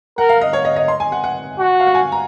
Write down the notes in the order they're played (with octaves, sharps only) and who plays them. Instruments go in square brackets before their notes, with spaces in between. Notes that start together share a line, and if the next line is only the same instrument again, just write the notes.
[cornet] A#4 [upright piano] F#5
[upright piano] F5
D#5
C#5
D#5
D#5
C6
G#5
F#5
F#5
[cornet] F#4
[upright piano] F5
F#5
G#5
A#5